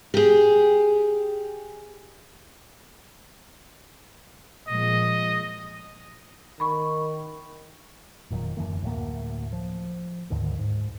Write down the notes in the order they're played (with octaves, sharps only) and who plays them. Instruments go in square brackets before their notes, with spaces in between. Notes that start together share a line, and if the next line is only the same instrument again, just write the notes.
[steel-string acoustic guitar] G4 G#4
[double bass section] A#2 F3 G#3 [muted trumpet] D#5
[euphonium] D#3 [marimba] B5 C#6
[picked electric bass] F1 A#2 D#3 F#3
F#2 D3 E3 A#3
D2 A2 F#3 A#3
F3
D2 G#2 D3 D#3
G#2